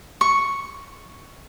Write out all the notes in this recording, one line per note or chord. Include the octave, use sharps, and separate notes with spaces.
C#6